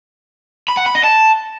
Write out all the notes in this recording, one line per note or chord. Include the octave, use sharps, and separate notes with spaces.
B5
F#5
B5
D#5
A5